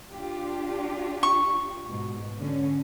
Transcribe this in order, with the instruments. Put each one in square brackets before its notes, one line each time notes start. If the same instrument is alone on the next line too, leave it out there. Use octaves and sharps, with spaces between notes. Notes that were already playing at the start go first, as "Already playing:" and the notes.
[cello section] D4 F4 G4
[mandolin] C#6
[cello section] G#2 B2
D3 C#4